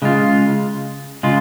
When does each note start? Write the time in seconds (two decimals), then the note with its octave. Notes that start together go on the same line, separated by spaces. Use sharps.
0.02 C#3 G#3 F4
1.23 C#3 G#3 F4